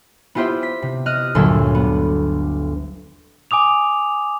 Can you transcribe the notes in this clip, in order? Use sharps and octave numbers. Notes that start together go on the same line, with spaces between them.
B3 E4 F4 G4 C5 E5
B6
C3
D#5 D#6 F6 F#6
G1 D2 A#2 F#3 A4 E6
B3
G#5 D6 D#6 F7